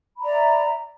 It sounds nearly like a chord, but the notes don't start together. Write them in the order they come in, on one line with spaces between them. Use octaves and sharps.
B5 A#5 D5 E5